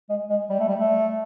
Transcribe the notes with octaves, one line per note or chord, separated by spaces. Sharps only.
G#3
G#3
G3
A3
G3
A3